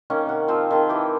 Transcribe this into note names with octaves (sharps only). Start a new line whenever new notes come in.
D#3 A#3 C#4 D#4
C3 F#5
F3 C4 F4
D#3 C4 G#4 A5
E3 D#4 G4